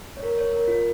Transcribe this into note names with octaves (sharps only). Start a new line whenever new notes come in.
C#5
A#4
C#5
A#4
F4